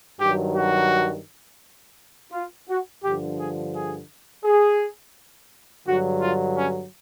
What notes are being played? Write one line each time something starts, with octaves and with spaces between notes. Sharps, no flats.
G2 D#3 F#3 G4
F#4
F4
F#4
G2 D3 F3 G4
G#4
G#4
G#4
G2 D3 F#3 F#4
F4
C#4